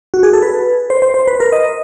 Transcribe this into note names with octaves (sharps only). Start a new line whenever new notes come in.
F#4
G#4
A4
B4
C5
C5
C5
B4
A#4
D#5